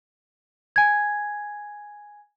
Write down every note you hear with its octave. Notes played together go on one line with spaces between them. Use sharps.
G#5 G#6